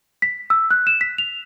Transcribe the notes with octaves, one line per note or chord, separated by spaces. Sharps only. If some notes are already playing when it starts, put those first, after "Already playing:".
B6
E6
F#6
E7
B6
F7